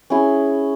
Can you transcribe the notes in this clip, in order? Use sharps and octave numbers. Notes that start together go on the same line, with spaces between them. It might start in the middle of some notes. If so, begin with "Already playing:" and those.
C#4 E4 G#4